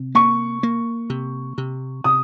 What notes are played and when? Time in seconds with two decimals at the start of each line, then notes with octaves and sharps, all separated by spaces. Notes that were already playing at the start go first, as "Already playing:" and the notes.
Already playing: C3
0.15 A#3 C#6
0.63 A#3
1.10 C3
1.58 C3
2.04 C3 D#6